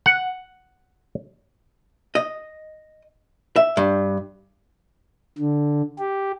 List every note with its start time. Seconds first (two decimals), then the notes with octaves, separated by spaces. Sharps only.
0.06 F#5
2.15 D#5
3.56 E5
3.77 G2
5.39 D3
5.99 G4